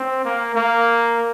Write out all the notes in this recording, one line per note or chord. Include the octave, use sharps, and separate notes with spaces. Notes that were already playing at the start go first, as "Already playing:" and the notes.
Already playing: C4
A#3
A#3